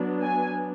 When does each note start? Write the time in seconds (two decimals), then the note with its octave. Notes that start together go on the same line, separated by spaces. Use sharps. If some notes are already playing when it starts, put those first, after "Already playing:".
Already playing: F#3 B3 D4
0.22 G#5